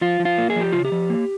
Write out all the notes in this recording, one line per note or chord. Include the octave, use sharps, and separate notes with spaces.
F3 F4
F3
F4
A#3
G#4
F3
G4
C#3 F4
G4
F3
A#3